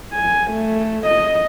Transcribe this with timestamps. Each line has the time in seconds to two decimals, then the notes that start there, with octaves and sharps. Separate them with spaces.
0.14 G#5
0.51 A3
1.06 D#5